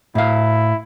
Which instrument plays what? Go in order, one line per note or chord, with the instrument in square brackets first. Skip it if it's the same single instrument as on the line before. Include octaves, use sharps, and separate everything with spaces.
[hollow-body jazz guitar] A2 F5 [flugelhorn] E4